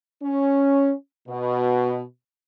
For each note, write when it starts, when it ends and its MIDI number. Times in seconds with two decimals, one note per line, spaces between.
0.22 0.92 61
1.28 2.00 47